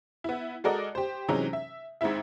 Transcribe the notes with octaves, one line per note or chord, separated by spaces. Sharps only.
B3 E4
G#3 F#4 A4 A#4 D5 D#5
G4 C5
C3 E3 F#3 G#3 C#4 D#4
E5
G#1 G#2 C4 E4 E5